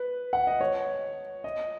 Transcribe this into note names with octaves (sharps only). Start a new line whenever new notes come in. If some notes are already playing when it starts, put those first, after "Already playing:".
Already playing: B4
F#5
D#5
C#5
D#5